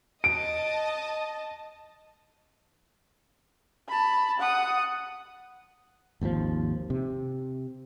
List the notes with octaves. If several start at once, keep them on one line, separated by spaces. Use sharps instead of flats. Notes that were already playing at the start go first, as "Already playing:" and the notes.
D#5 A5 D7
A5 B5
F#5 D#6
G#1 D#2 D3 F3
C3